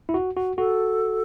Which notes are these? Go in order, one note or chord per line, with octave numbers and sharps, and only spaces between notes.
E4
F#4
F#4
F#4 A4